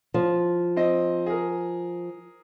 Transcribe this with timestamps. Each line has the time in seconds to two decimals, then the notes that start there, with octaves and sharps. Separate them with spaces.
0.14 F3
0.76 C4 C5 D#5
1.26 G#4 A#4